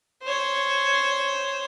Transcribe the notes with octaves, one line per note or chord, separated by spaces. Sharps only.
C5 C#5